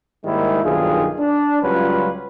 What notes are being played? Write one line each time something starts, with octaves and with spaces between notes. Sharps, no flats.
G#2 D#3 G3 G#3 A#3 E4
B1 G2 D#3 F4 G#4
D4
C#2 F#3 G3 C#4 F4 B4